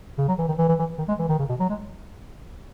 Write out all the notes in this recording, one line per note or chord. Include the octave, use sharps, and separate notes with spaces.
C#3
F#3
E3
D#3
E3
E3
E3
D#3
G#3
E3
D#3
C#3
B2
F#3
G#3